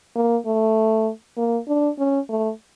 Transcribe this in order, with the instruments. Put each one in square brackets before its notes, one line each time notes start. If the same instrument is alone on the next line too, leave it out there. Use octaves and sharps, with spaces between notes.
[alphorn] A#3
A3
A#3
D4
C#4
A3